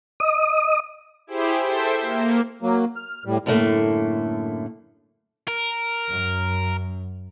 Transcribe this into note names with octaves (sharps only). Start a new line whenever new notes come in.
D#5 D#6
E4 G4 G#4 C5
A4 C5 E5 G5
A#3
F#3 A#3
F6
A2 G3
F#2 A2 D3 E3 A3 A#3
A#4
F#2